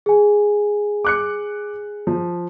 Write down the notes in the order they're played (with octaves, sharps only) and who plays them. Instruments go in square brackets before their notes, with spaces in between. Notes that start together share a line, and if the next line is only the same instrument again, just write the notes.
[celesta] G#4 G#5
[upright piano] D6 F#6 C#7
F3